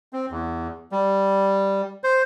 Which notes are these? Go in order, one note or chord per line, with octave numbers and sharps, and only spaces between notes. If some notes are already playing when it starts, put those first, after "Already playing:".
C4
E2
G3
C5